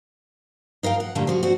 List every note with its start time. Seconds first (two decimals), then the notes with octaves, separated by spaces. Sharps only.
0.83 D#4 A#4 F5 G5
1.00 F#5
1.15 A#2 D3 G3 A3 A#3
1.27 F3 F#4 G#4
1.43 C4 D4 F#4